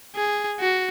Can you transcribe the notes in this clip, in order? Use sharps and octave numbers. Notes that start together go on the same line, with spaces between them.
G#4
F#4